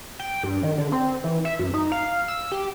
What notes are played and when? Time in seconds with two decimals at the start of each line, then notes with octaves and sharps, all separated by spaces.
0.20 G5
0.44 G2
0.63 D#3
0.78 D3
0.92 C4
1.24 E3
1.45 E5
1.59 F#2
1.74 D#4
1.92 F5
2.28 E6
2.52 G4